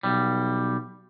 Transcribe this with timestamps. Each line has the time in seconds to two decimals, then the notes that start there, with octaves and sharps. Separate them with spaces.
0.03 B1 G3